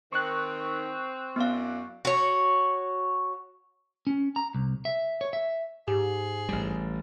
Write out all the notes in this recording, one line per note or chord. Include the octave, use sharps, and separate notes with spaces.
D#3 C4 C#6 F#6
F#2 B3 E4 D5 F5
F#4 C#5
C#4
A#5
C2
E5
C#5
E5
G#2 G4 G#4
A1 G3